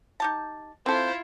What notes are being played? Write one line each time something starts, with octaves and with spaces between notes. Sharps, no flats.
D#4 G4 A5
A#3 C4 E4 F4 A4 C5